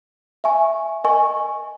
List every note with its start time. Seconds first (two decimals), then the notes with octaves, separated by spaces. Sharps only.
0.44 E5 G#5 C#6
1.04 A#4 D#5 G#5 C#6